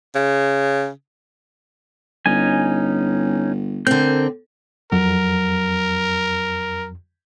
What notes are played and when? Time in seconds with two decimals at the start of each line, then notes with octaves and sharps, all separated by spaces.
0.15 C#3
2.26 G1 C#4 D#4 G#5
3.87 D3 C4 A#4 G6
4.92 F2 F#3 A#4